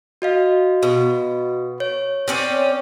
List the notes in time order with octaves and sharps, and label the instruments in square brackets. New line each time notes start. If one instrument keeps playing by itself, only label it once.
[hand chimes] F#4 D#5 F5
[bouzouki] B2
[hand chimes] C#5
[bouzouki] C4 C#4 D5